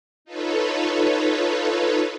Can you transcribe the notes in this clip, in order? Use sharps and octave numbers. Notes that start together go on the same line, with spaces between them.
D#4 F4 A4 B4 C#5